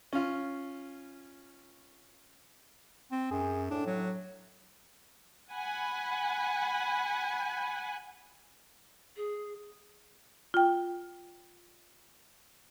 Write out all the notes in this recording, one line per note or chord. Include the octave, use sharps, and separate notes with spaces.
C#4 F4
C4
F#2 G#4
A2 D4
F#3
F#5 G#5 B5
G#4
F4 G5